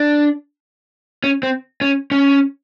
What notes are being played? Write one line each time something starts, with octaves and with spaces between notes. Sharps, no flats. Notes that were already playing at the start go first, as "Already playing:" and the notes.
Already playing: D4
C#4
C4
C#4
C#4